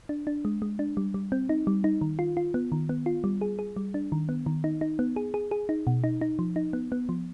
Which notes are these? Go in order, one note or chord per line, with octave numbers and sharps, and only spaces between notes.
D4
D4
G#3
G#3
D4
G3
G3
C4
D#4
G3
D#4
D#3
F4
F4
B3
D#3
B3
F4
G3
G#4
G#4
G3
D4
D#3
B3
D#3
D#4
D#4
B3
G#4
G#4
G#4
D#4
B2
D#4
D#4
F3
D#4
B3
B3
F3